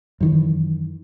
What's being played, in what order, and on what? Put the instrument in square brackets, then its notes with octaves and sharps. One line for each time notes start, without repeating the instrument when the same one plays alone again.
[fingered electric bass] F#2 D#3 E3